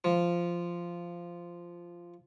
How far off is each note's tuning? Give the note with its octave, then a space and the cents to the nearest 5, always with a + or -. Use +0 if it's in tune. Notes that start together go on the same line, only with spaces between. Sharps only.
F3 -10